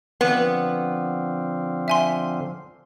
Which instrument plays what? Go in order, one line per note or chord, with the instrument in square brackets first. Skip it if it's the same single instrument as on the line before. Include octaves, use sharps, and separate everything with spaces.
[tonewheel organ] D3 F3 C4 [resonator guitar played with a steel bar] B3
[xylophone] E5 G#5 C6